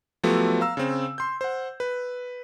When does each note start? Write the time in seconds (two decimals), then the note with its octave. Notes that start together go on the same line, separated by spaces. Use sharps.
0.23 F3 F#3 A3 B3 G4 A4
0.61 F5 A#5 E6
0.77 C#3 C4
1.18 C6 G6
1.41 C5 F#5
1.80 B4